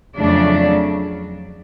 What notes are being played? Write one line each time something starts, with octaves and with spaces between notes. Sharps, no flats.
F2 C#3 F#3 A3 D4